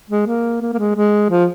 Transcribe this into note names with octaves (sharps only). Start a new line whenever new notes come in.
G#3
A#3
A#3
A#3
G#3
G#3
F3